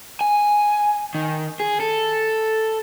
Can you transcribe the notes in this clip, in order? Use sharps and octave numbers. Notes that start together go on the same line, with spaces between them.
G#5
D#3
G#4
A4